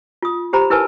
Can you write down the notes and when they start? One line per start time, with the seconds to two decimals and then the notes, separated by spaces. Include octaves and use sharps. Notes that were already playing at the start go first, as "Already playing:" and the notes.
0.22 F4 D#6
0.53 G4 C5 A#5 B5
0.70 E4 A#4 B4 G#5 A5